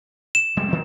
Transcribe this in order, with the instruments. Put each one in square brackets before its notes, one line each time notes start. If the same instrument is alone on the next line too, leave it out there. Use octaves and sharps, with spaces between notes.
[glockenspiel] E7
[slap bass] F1 G3 G#3
D#3 F#3 C4